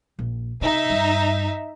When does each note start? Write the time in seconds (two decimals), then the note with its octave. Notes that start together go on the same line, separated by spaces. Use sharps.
0.19 A#1
0.61 C3 D#4 E5
0.90 G2